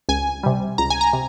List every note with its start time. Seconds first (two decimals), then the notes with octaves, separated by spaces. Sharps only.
0.09 C#2 G#5
0.43 C3 G3
0.78 C#2 A#5
0.90 G#5
1.01 A#5
1.13 C3